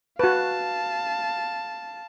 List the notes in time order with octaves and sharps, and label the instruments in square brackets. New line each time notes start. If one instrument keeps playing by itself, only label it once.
[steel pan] F#4 B4 [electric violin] F5 A5